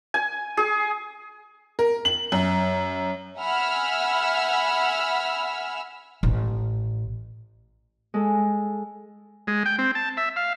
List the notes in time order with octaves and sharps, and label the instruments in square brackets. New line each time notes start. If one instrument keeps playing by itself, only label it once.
[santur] G#5
G#4
[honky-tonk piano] A#4
F#7
F#2
[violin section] E5 F#5 G#5 B5 E6 F6
[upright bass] A1
[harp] G#3 A4
[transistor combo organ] G#3
G5
C4
A5
E5
F5